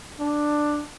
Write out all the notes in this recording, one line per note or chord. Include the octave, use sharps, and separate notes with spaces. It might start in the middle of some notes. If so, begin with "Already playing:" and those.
D4